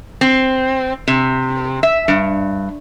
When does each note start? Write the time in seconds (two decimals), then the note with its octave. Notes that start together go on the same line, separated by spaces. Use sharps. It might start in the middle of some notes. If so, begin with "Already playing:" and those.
0.21 C4
1.08 C3
1.83 E5
2.08 G2